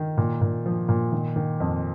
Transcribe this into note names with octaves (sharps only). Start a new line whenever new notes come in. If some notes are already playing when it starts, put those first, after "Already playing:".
Already playing: D#3
A#2
A#2
F3
A#2
D#3
D#3
F2